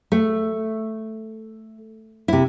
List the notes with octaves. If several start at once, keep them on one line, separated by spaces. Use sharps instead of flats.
A3
C3 E4